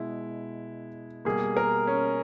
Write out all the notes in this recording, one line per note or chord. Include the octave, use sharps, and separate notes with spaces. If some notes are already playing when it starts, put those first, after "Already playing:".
Already playing: B2 G#3 E4
B2 G3 A#3 G#4
A#4
C#4